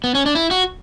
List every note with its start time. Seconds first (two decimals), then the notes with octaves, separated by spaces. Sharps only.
0.04 B3
0.15 C#4
0.26 D4
0.35 E4
0.51 F#4